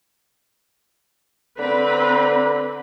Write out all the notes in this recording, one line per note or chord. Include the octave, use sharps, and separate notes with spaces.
D3 C4 B4 B5